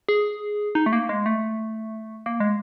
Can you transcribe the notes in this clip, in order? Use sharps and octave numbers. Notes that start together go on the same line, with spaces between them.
G#4
D#4
A3
A#3
G#3
A3
A#3
G#3